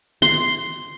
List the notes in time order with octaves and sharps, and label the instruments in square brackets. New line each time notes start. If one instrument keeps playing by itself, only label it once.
[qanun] C6